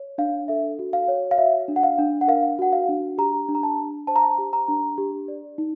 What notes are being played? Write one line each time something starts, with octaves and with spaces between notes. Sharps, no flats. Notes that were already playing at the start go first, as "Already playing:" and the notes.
Already playing: C#5
D4 F5
A4 E5
F#4
F5
C#5
F5
F#4 E5
D4
F#5
F5
D4
F#5
A#4 F5
F#4 F#5
F5
D4
G4 A#5
D4
A#5
A5
D4
C5 A5
A#5
A5
G4
A#5
D4
G4
D5
D#4